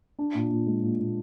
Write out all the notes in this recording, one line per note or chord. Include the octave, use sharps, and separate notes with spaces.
D4
A#2
A#2
G#3
A#2
A#2